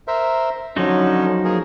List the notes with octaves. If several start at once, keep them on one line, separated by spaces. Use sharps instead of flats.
A#4 C5 E5
D3 F3 F#3 C#4 D#4
A#3 G#4 A#4